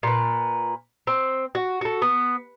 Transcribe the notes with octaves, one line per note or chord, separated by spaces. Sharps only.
A#2 B4
C4
F#4
F#4 A4
B3